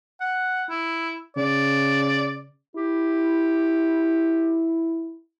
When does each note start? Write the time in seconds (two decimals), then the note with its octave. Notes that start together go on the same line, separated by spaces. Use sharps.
0.21 F#5
0.69 E4
1.36 C#3 D5
2.76 E4 G4